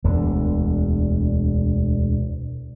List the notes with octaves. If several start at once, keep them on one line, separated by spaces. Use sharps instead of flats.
E1 D2 D3